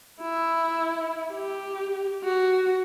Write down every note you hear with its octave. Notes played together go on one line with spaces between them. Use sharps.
E4
G4
F#4